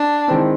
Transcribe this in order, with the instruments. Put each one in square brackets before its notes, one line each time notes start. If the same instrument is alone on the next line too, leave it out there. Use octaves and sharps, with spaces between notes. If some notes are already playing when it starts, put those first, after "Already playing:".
Already playing: [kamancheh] D4
[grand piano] D#3 G#3 C4 E4